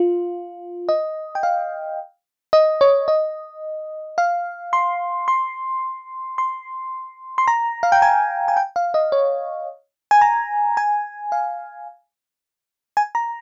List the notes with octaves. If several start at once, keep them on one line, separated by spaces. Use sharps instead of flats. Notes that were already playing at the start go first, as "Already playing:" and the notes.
Already playing: F4
D#5
G5
F5
D#5
C#5
D#5
F5
C6
C6
C6
C6
A#5
F5
G5
G#5
G#5
G5
F5
D#5
C#5
G#5
A#5
G#5
F5
G#5
A#5